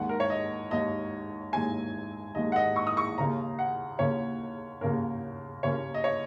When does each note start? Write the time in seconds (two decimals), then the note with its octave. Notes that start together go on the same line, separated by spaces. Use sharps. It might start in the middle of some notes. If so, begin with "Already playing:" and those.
Already playing: D#2 D#3 G#3 F#5
0.09 A#4
0.20 C#5
0.30 D#5
0.71 D#2 D#3 G#3 D#5
1.53 D#2 D#3 G#3 G#5
2.35 D#2 D#3 G#3 D#5
2.52 F#5
2.56 D#5
2.76 C#6
2.87 D#6
2.97 C#6
3.18 D#2 C#3 A#3 C#4 A#5
3.59 F#5
3.99 D#2 C#3 A#3 C#4 C#5
4.81 D#2 C#3 A#3 C#4 A#4
5.63 D#2 C#3 A#3 C#4 C#5
5.94 D#5
6.04 C#5